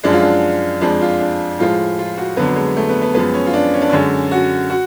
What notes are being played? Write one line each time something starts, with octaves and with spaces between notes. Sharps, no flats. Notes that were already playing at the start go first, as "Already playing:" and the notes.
F#2 F3 G#3 D4
F4
D4
F2 F3 G#3 D4
F4
D4
A2 F3 G#3 F4
F4
F#4
F2 D3 F#3 B3
G#3
A3
B3
B3
F#2 F3 G#3 B3
C#4
F4
D4
C#4
D4
F#2 D3 G#3 C#4
F#4
F#4